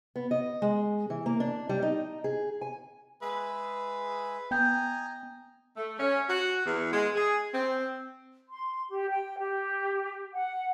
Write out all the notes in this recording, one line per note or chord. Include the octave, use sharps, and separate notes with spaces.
B3
D#5
G#3
E3
A#3
D4
G3
D#4
G#4
G#5
G#3 G#4 B4 E5
B3 D#5 G5 G#5 A#5 G6
A3
C#4
F#4
E2
G#3
G#4
C4
C6
G4
G5
G4
F#5